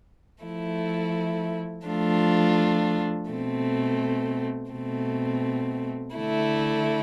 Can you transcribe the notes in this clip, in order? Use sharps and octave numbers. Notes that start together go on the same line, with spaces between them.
F3 A3 E4
F3 A3 D4 F4
B2 A3 C4
B2 A3 C4
D3 A3 E4